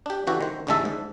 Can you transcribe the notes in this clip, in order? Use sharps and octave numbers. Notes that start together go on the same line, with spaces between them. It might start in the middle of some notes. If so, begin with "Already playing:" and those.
D4 G4
C#3 E3 F#4 G4 A4
D#3 C5
A1 D#2 D3 G#3 A4 E5
G#2